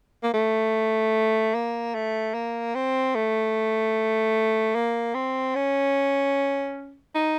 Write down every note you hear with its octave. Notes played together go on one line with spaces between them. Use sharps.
A#3
A3
A#3
A3
A#3
C4
A3
A#3
C4
C#4
D#4